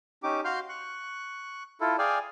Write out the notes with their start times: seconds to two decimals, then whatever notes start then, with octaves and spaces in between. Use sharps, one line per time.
0.23 C#4 D#4 G4 D6
0.45 F#4 F5 C6 F6 G6
0.69 C#6 F#6
1.81 E4 F4 A4
1.98 G#4 D5 F5 G5 G#5